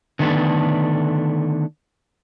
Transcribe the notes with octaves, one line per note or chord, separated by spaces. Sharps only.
D3 D#3 A3 B3 D4